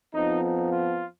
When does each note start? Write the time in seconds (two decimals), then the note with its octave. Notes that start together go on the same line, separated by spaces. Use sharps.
0.14 F2 F3 B3 D#4
0.43 D#4
0.71 F4